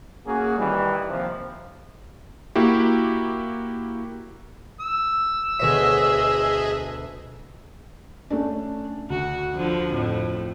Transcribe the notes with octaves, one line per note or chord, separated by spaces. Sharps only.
A#3 C#4 F#4 G#4
D#3 E3 G3
D#2 C3 F3
A#3 E4 F#4 G4
E6
D2 B2 G#4 C#5 D#5 E5
A3 C#4 D4
D2 F#4
D3 F3
F2 A2